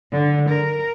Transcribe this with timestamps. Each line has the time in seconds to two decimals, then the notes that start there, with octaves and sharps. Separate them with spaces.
0.12 D3
0.49 A#4